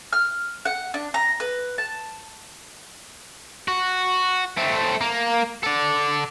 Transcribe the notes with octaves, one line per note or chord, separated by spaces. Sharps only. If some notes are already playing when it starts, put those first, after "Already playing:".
F6
F#5
D4
A#5
B4
A5
F#4
A3 C4
A#3
A4 D5